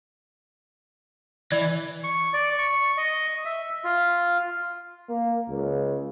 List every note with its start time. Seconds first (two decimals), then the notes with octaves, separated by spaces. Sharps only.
1.52 E3 D5
2.04 C#6
2.33 D5
2.59 C#6
2.98 D#5
3.45 E5
3.84 F4
5.09 A#3
5.49 C#2